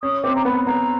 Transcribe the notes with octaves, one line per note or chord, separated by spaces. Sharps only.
C#4 D#6
C4 D6
A#5
B3 B5
B3 A#5